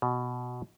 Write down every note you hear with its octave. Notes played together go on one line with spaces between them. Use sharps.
B2